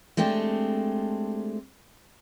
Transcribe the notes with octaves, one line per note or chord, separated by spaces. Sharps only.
G#3 A3 C4 D4 G4